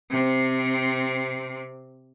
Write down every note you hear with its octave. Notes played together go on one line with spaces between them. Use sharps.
C3 C4